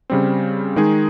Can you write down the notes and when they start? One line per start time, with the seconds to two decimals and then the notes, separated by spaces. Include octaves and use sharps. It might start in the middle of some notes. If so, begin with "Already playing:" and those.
0.10 C#3 G3 C4
0.76 D#3 G#3 D#4 G#4